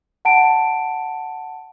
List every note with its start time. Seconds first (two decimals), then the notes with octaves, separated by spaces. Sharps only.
0.25 F#5 A5 D7